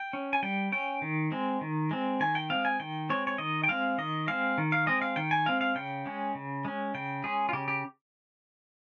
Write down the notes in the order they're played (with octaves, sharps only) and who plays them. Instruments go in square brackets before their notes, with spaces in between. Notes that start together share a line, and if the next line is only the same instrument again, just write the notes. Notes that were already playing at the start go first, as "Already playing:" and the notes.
Already playing: [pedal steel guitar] G5
C#4
G#5
G3 G5
C#4 G5
D#3
G#3 C4
D#3
G#3 C4
D#3 G#5
G5
G#3 C4 F5
G#5
D#3 G5
G#3 C4 C#5
C#5
D#3 D#5
G5
G#3 C4 F5
D#3 D#5
G#3 C4 F5
D#3
F5
G#3 C4 D#5
F5
D#3 G5
G#5
G#3 C4 F5
F5
C#3 G5
G#3 C#4
C#3
G#3 C#4
C#3 G5
G#3 C#4 G#4
F4
C#3 G4
G4